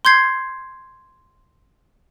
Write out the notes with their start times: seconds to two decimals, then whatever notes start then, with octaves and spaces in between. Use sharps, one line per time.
0.05 C6 G6 G#6 C7